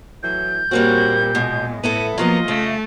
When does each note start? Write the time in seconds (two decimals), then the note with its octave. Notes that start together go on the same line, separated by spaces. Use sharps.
0.23 A2 E3 F#3 G6
0.71 A#2 F3 G3 A#3 C4 C#4 F#4
1.35 B2 G#3
1.84 A2 B3 E4 A4 D#7
2.18 F3 F#3 A#3 B3 F4 D#5
2.48 C#3 A3